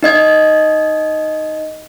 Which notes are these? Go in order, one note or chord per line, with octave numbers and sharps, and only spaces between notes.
D#4 D#5 G#6